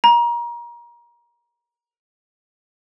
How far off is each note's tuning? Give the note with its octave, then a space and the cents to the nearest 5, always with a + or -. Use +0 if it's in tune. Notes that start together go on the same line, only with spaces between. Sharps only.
A#5 +30